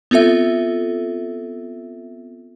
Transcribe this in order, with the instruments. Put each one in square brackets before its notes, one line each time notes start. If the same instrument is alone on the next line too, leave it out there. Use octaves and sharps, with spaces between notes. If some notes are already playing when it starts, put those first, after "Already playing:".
[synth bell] B3 C4 F4 A4 E5